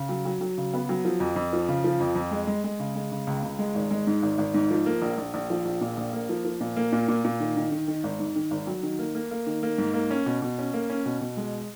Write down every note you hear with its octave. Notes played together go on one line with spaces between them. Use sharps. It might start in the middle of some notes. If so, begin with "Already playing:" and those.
Already playing: C#3
F#3
F#3
F#3
C#3
B3
F#3
F3
F2
F2
F3
C#3
F3
F2
F2
G#3
G#3
G#3
C#3
G#3
C#3
C#2
C#2
G#3
G#1
G#3
G#2
G#1
G#1
G#2
F3
A#3
A#1
A#1
A#1
F3
A#1
A#2
A#1
A#3
F3
F3
A#2
A#3
A#2
A#2
A#2
D#3
D#3
D#3
D#3
G#1
G#2
D#3
G#1
F#3
D#3
A#3
A#3
A#3
D#3
A#3
G#2
A#3
C#4
B2
B2
C#4
A#3
C#4
B2
B2
G#3